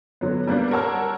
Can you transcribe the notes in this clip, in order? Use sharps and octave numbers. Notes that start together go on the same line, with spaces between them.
D3 F#3 B3
G3 A#3 B3 D4
A#4 C#5 F#5 A5 E6 F6